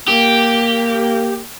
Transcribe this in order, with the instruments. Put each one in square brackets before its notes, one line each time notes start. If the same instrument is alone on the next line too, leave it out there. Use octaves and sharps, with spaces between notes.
[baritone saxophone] A#3 [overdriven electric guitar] G4